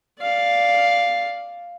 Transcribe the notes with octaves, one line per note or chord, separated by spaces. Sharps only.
D5 F5